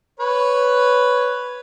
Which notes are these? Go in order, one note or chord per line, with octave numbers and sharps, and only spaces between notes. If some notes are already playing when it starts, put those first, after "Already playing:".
B4 C#5